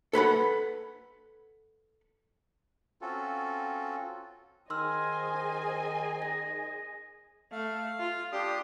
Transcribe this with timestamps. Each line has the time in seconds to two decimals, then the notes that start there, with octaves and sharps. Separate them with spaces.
0.13 A4 B4 F#5 B5
3.01 C4 C#4 F4 F#4 A4
4.70 D#3 G#4 C5 D#5 G#5 C6 E6 F6
6.22 A#6
7.52 A3 F5
7.99 F4
8.32 D4 G4 C6 D#6